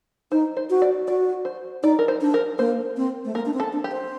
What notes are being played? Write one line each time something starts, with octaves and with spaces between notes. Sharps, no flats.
D#4 C5
C5
F#4
D5
F#4 D5
C5
D#4 D5
A#4
C5
D4
A#4
A#3 C5
C4
A3
A#3 A#4
D4
C4
A4
D4
G4
C5